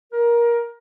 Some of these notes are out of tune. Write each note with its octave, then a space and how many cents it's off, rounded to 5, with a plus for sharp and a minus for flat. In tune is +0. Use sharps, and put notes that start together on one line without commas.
A#4 +20